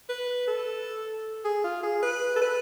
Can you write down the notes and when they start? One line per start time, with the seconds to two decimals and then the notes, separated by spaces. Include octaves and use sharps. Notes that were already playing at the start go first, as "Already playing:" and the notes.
0.09 B4
0.48 A4
1.45 G#4
1.64 F4
1.83 G#4
2.03 B4
2.36 A4
2.42 B4